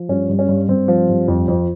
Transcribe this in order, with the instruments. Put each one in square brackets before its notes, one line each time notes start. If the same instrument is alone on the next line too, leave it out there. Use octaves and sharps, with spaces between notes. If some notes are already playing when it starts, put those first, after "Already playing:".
Already playing: [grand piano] F3
G2 C#4
G2
C#4
G2
G2 C4
F3
G2
F2
F2